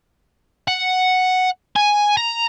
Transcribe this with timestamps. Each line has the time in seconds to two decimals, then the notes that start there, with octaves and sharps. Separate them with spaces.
0.68 F#5
1.76 G#5
2.17 A#5